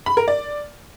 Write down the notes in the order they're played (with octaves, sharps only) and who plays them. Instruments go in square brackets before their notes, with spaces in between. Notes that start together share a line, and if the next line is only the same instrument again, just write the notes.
[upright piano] B5
A#4
D5